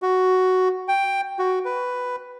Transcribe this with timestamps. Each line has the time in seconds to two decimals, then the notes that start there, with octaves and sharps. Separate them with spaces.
0.02 F#4
0.88 G5
1.39 F#4
1.65 B4